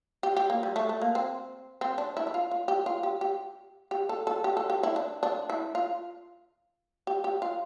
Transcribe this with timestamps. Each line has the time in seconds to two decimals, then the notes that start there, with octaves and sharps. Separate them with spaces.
0.23 G4
0.37 G4
0.50 A#3
0.63 G3
0.76 A3
0.89 A3
1.01 A#3
1.15 C4
1.81 C4
1.98 D4
2.17 E4
2.27 E4
2.34 F4
2.51 F4
2.68 G4
2.86 F4
3.03 G4
3.21 G4
3.91 G4
4.09 A4
4.27 A4
4.44 G4
4.57 A4
4.70 G4
4.83 E4
4.96 D4
5.23 D4
5.50 E4
5.75 F4
7.07 G4
7.24 G4
7.42 F4